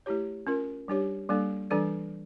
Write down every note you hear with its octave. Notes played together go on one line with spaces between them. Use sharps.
A3 E4 G4 C#5
C#4 F4 A#4
G3 D4 G4 C#5
G3 A#3 D4 A4
E3 G3 D4 A4 D5